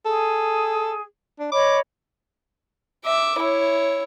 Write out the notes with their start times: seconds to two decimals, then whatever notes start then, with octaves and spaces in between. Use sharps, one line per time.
0.05 G#4 A4
1.39 D4
1.52 C#5 D#5 B5 D6
3.05 E5 D6
3.38 E4 C#5